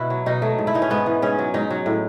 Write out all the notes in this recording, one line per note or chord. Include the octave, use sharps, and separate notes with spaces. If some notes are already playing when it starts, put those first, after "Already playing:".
Already playing: B2 E4 F#4
F#3
B2 D#4
F#3 A3
G#2
E4
E3 D#4
C#4
G#2 B3
E3
G#2 C#4
F#3
G#2 D#4
F#3
A2